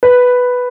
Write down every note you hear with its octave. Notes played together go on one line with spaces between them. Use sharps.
B4